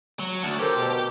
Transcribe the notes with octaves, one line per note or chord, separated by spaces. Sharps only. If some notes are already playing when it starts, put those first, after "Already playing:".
F#3
D2 A5 F#6
G4 A4 A#4 C5
B2